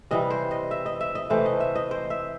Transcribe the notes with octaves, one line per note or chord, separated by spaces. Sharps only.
C3 E3 G3 D#5
C5
D#5
E5
D#5
E5
D#5
C3 E3 A3 C5
D#5
E5
D#5
C5
E5